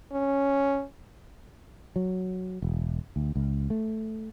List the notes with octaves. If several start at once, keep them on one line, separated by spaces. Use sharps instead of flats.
C#4
F#3
E1
D2
C#2
A3